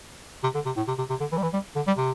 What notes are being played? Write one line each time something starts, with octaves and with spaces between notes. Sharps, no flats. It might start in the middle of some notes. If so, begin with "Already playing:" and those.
C3
D3
C3
A2
C3
C3
C3
D3
E3
G3
E3
G3
D3
G3
C3